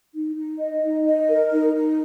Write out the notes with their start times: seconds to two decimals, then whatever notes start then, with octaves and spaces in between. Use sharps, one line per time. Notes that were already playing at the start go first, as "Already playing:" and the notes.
0.14 D#4
0.36 D#4
0.59 D#5
0.82 D#4
1.05 D#5
1.28 A#4
1.52 D#4
1.75 D#4